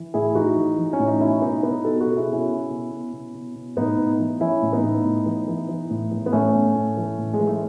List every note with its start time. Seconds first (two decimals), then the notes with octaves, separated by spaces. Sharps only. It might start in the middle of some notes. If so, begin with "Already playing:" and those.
Already playing: E3
0.14 A2 E4 G#4
0.35 E3 D#4 F#4
0.56 E3
0.78 E3
0.93 C#4
0.99 A2
1.07 D#4
1.21 B2 C#4 E4
1.42 B2 B3 D#4
1.63 B2 B3 D#4
1.84 B2 F#4 A4
2.01 F#4 A4
2.06 B2
2.17 E4 G#4
2.27 B2
2.33 C#4 E4
2.49 B2
2.70 B2
2.91 B2
3.13 B2
3.34 B2
3.55 B2
3.77 A2 B3 D#4
3.98 A2
4.19 E3
4.41 E3 C#4 E4
4.62 A2
4.73 B3 D#4
4.83 A2
5.05 A2
5.26 E3
5.48 E3
5.69 E3
5.90 A2
6.11 E3
6.26 B3
6.33 A2 A3 C#4
6.54 A2
6.75 A2
6.97 E3
7.18 A2
7.34 G#3
7.40 E3
7.47 A3